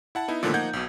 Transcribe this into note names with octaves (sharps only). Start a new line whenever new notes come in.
E4 F#5 A5
B3 D#4 E4
A#2 D3 D#3 F3 A3 B3
F3 A#3 D#4 F#5 G6 G#6
B1 B2